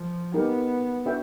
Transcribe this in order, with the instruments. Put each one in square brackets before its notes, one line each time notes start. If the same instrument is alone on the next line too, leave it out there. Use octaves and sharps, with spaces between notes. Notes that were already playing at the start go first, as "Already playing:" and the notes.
Already playing: [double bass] F3
[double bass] B3 [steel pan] D#4 G4 A#4
[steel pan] D4 F#4 B4 E5 G5